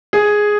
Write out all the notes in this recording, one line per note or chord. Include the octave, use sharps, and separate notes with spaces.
G#4